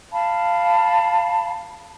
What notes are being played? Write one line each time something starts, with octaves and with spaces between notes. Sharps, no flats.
F5 A5 B5